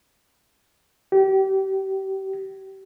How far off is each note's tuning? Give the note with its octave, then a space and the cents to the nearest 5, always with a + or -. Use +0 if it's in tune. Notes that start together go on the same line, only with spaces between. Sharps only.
G4 -30